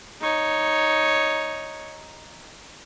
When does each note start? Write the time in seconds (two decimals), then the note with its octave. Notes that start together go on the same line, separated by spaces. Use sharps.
0.21 D#4 C#5